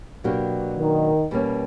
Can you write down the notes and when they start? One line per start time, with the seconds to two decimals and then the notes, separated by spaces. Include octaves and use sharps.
0.24 B2 F#3 A#3 D4 G4
0.77 D#3
1.31 B2 G3 A#3 C#4